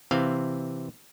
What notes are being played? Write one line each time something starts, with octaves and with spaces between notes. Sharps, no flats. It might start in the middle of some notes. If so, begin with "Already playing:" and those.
C3 E3 C4 F5